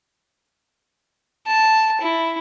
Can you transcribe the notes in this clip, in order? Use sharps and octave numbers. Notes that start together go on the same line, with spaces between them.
A5
E4